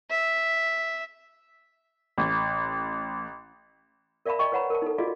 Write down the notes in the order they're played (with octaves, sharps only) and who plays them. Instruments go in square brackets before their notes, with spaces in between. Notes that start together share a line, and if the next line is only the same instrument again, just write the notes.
[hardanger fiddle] E5
[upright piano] A1
[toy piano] A#4 D5 E5 F5 A5 B5
D5 D#5 G5 A5 C#6
B4 C#5 F#5 A#5 B5
A#4 A5
D#4 A4
F4 F#4 G#4 D5 D#5 F5